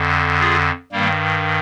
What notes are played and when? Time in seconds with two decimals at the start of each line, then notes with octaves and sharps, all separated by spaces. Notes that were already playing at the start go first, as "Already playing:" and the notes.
Already playing: F2 D3
0.40 F4 G#4
0.92 G2 D#3 G3 A#3